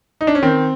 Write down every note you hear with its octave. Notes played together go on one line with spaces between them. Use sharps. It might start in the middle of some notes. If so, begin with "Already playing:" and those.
D#4
D4
C#4
D#3 C4